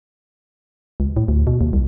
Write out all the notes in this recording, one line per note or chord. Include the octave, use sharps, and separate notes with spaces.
C#2
A2
D2
B2
D#2
C2